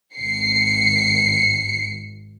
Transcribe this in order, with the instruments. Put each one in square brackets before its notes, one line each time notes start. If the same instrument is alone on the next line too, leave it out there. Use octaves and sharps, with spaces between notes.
[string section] G#1 C7 C#7